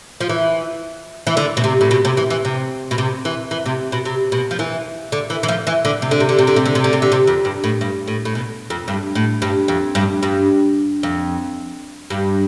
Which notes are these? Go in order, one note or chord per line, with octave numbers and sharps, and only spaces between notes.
F3
E3
E3
D3
B2
C3
A2
B2
C3
E3
E3
C3
B2
C3
E3
E3
C3
B2
C3
B2
F3
E3
D3
E3
E3
F3
E3
D3
C3
D3
C3
D3
C3
D3
C3
D3
C3
D3
C3
D3
C3
F2
G2
A2
G2
A2
A2
B2
F2
G2
A2
G2
F2
G2
G2
F2
G2